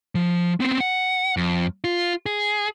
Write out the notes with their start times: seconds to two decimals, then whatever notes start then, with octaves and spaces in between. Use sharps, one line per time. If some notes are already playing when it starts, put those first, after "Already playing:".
0.15 F3
0.60 B3 C4
0.80 F#5
1.37 F2
1.84 F4
2.26 G#4